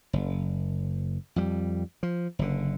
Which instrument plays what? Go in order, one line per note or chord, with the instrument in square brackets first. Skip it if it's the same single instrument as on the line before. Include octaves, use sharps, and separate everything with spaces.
[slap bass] F#1
F2 G3
F3
F#1 D3